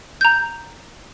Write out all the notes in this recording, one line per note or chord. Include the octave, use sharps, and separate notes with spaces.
A#5 G6